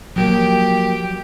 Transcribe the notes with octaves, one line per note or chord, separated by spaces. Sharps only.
F3 F#3 A#3 G4